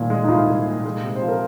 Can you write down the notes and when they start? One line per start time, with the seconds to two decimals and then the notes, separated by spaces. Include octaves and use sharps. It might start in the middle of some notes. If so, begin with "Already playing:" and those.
Already playing: C2 A#2 D#3
0.10 G#3
0.24 D#4
0.28 C2 F4
0.47 C2
0.65 A#2
0.85 G#3
1.04 C3
1.16 C5
1.22 F3
1.28 A#4